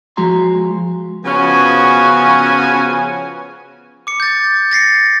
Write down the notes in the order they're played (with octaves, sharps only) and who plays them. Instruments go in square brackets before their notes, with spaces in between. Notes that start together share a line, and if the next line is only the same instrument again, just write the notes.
[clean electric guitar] F3 G#3 F#4 A#5 C6
[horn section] C#3 F3 B3 C#4 F#4 G#5
[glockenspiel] D6 C#7
G6 A6
A6 A#6 C7 C#7